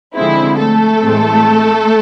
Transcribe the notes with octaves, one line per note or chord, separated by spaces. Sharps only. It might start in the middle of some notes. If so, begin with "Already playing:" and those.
D3 F3 G#3 C4 E4
A3 A4
A2 E3 G#3 C4